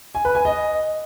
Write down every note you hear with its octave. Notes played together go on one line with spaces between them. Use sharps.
G#5
B4
G#5
D#5